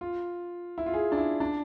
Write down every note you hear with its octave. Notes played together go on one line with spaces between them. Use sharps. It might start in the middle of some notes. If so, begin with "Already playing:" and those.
F4
E4
F4
G#4
D4
E4
D4